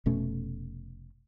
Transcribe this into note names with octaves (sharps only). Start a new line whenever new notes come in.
F1 B2 A3 C#4